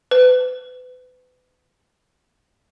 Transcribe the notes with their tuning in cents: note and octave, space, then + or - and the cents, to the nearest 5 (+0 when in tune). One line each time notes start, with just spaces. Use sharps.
B4 +35